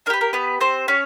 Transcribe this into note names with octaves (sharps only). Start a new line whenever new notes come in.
D4 A#4
G4 B4
A#4
B3 B4
C4 C5
C#4 C#5